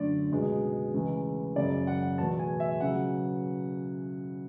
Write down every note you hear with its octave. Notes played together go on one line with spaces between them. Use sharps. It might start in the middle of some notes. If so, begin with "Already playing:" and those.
Already playing: F#2 D3 A3 D5
C#2 B2 G#3
C#2 C#3 E3 A3
F#1 F#2 C#3 D5
F#5
E2 B2 A3 A5
G#5
E5
C#3 F#3 F#5